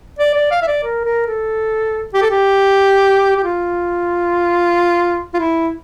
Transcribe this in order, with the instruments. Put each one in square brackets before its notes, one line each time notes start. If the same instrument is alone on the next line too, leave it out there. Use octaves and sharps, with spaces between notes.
[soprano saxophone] D5
D5
F5
E5
D5
A#4
A#4
A4
G4
A4
G4
G4
F4
F4
E4